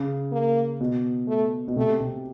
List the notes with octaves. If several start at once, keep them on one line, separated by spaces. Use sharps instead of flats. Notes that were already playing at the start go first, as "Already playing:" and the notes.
Already playing: C#3
A#3
B2
A3
B2
C3 A3
C3